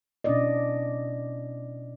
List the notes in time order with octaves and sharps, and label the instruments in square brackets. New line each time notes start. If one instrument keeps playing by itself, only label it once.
[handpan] B2 C#4 D4 E4 D5 D#5